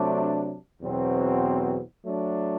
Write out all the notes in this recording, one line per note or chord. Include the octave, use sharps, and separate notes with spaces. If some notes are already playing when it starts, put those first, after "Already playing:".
Already playing: C3 F#3 A3 D4
E2 B2 F#3 C4
F#3 A3 D4